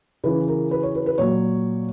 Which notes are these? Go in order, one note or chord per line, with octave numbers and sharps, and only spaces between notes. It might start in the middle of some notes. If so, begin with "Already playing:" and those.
C#3 E3 B4
A#4
B4
C#5
B4
B4
A#2 F#3 C#5